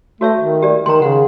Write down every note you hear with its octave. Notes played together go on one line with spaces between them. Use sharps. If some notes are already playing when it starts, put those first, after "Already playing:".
A3 F#4 C#5 E5
D#3
G4 D5
D#3 A#5 C6
C#3 F#5